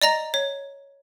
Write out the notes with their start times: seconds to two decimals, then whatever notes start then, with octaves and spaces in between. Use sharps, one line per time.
0.02 D5 D#5 A#5 A#6
0.34 C#5